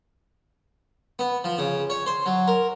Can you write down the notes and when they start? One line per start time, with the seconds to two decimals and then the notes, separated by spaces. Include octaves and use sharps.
1.19 B3
1.44 F3
1.58 C#3
1.90 C#5
2.06 C5
2.26 F#3
2.48 A#4